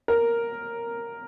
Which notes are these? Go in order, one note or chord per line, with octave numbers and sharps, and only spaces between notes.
A#4